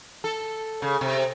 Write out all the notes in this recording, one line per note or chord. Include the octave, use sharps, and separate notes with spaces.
A4
C#3
C3